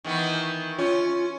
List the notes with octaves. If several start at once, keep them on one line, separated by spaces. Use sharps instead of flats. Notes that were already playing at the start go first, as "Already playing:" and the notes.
D#3 E3 B3
C#4 F4